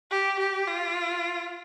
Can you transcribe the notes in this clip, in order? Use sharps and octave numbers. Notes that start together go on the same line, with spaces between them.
G4
G4
F4